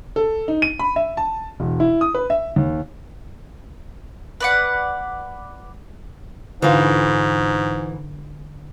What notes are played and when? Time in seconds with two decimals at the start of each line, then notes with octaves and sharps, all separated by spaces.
0.16 A4
0.48 D#4
0.62 D#7
0.79 B5
0.96 E5
1.17 A5
1.60 E1
1.80 E4
2.01 D#6
2.15 B4
2.30 E5
2.56 D#2
4.41 B4 D5 F#5
6.62 G#2 D3 E3 F4 B4